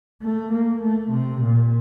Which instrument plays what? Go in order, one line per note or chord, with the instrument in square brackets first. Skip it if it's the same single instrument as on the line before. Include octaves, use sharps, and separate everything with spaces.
[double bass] A3
A#3
A3
C3
A#2